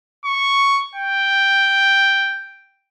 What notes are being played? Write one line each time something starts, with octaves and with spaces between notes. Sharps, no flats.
C#6
G5